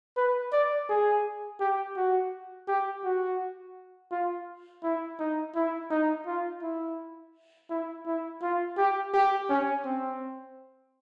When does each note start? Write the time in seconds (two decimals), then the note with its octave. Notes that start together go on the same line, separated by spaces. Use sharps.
0.17 B4
0.52 D5
0.89 G#4
1.60 G4
1.97 F#4
2.68 G4
3.04 F#4
4.11 F4
4.83 E4
5.19 D#4
5.55 E4
5.90 D#4
6.26 F4
6.62 E4
7.70 E4
8.06 E4
8.42 F4
8.78 G4
9.14 G4
9.50 C#4
9.85 C4